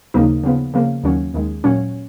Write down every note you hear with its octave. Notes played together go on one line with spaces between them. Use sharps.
D#2 C#3 F3 A#3 D#4
C#3 F3 B3
C#3 F3 A#3
D#2 D#3 F#3 C#4
D#2 D#3 G#3
A#2 F#3 C#4